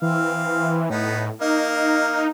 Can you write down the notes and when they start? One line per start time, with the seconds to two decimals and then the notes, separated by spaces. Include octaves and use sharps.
0.02 E3 C4 F5
0.90 A2 B3 D#4
1.41 A#3 D#4 F5